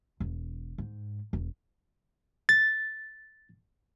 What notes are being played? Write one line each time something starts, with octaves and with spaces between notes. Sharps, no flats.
E1
G#2
E1
A6